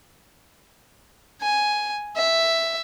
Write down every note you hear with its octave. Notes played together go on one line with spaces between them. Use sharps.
G#5
E5